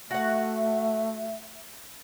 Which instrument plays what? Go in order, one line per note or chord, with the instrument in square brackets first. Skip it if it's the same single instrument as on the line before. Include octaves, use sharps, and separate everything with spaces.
[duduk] A3 [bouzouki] F#4 F#5 [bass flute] E5